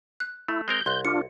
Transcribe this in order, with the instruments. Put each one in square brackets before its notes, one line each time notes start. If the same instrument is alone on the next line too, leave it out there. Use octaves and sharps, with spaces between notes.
[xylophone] F#6
[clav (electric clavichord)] A3 [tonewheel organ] E4
[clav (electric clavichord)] G#3 C4 A#4 [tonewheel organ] G6
[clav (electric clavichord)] C2 [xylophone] C6 F#6
[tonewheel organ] D4 F4 [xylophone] C#7